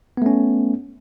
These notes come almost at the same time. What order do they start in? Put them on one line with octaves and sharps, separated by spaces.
B3 A3 C#4